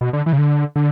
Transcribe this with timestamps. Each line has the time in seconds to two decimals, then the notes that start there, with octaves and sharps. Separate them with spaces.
0.01 B2
0.13 D3
0.26 E3
0.33 C#3
0.38 D3
0.76 D3